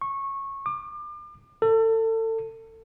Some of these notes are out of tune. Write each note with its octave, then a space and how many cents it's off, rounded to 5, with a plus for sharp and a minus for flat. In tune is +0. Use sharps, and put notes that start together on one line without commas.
C#6 -20
D6 +35
A4 +30